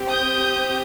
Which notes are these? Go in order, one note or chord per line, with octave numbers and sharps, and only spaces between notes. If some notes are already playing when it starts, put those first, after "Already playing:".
Already playing: C4 G4
D#6 G6